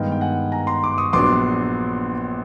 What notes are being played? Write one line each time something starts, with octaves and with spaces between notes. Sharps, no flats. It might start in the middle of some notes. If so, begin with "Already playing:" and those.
Already playing: G2 D#3 G#3 B3 F5 G5
G5
F#5 G#5
G#5 A#5
A#5 C6
C6 D6
C#6 D#6
A#1 A#2 F#3 B3 D4 C6 D6